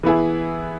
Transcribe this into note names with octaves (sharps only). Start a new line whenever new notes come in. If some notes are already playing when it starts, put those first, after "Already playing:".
E3 B3 E4 G#4